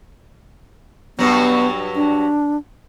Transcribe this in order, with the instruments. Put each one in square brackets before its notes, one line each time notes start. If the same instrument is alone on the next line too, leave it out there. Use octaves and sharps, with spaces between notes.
[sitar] G2 F#3 [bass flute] B3
[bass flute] D4